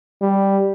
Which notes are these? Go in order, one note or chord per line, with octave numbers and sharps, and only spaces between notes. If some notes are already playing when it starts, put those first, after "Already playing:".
G3